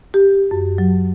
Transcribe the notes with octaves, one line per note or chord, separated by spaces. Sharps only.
G4
F#2
F#3